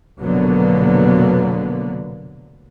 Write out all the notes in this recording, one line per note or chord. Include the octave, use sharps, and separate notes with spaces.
F1 B2 D3 F#3 A#3 B3